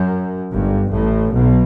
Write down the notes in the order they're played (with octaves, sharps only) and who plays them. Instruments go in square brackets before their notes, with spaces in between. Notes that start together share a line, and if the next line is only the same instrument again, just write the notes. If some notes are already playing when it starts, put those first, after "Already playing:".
Already playing: [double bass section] F#2
G1 G2
A1 A2
B1 B2